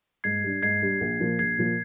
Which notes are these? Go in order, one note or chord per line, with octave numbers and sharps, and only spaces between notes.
G#2 G#6 C7
G3 D4
G#2 G#6 C7
G3 D4
A#1
A#2 F3 A#3
A#1 G#6 C7
A#2 F3 A#3